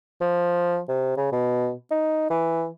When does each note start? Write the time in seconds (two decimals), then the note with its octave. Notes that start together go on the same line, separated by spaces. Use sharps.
0.21 F3
0.89 C3
1.17 C#3
1.32 B2
1.91 D#4
2.30 E3